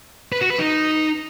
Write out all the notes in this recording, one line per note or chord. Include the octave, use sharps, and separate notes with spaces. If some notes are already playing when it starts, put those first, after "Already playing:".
B4
F#4
B4
D#4